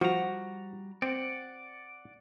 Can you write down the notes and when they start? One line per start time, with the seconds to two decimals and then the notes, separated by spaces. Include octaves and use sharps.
0.01 F3 G3 F#4 A#5
1.02 C4 D5 F#5